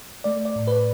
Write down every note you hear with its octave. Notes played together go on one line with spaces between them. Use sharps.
A3 D5
D5
A2
B4